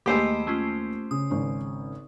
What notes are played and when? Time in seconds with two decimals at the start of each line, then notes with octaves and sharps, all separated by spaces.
0.06 D#2 G#3 A3 G4 C5 D#5 G#5 B5
0.47 A3 C#4 F4
1.11 C#3 D#6
1.30 G#1 C#3 C#4